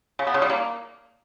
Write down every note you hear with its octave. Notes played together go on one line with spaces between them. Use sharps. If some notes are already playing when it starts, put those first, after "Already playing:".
C#3
B3
C#3
G3
A#3